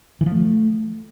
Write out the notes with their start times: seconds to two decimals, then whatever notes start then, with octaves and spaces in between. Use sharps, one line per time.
0.21 E3
0.26 F3
0.32 A3